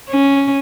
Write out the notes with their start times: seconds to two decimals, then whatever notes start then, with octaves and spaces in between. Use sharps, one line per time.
0.10 C#4